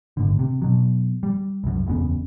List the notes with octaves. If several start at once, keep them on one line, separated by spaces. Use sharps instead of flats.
G#1 A2 D3
C3
B2 F#3
G3
C2 F#2
F#1 E2 B3 C#4